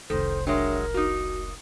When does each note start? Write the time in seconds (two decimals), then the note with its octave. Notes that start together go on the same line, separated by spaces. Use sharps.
0.10 F1 C2 D#3 A4 C5
0.47 F#3 G#3 D4 A#4 C#5 E5
0.94 A#3 D#4 F#4